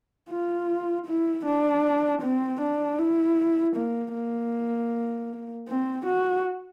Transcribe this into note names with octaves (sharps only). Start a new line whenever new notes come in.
F4
E4
D4
C4
D4
E4
A#3
A#3
C4
F#4